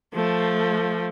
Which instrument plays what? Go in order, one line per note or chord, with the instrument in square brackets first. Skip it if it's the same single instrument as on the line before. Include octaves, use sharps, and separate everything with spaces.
[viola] F3 A3